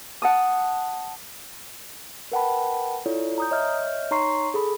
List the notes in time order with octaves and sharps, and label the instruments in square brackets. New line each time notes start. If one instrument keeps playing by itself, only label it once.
[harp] F#5 A5 D#6
[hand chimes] A#4 B4 F#5 G5 A5 B5
E4 F4 A4 C#5 D5
A#5 D#6 G6
C#5 D#5 E5 F6 G6
D#4 C#5 A#5 C6 C#6 C7
G#4 A4 B5